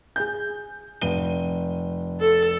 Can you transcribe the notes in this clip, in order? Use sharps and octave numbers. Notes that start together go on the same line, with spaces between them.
G#4 G6
F1 D#7 G7
A4